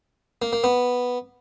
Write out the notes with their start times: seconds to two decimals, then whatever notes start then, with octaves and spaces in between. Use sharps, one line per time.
0.42 A#3
0.53 A#3
0.64 B3